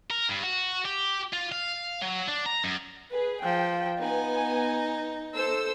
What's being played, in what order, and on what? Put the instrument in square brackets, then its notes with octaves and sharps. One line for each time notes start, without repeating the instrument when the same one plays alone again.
[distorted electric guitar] A#4
G2
F#4
G4
F4
F5
F#3
D4
A#5
F#2
[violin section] G#4 B4
[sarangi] F3 [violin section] G5
[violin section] B3 G#5 [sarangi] D#4
[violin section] A4 C5 E6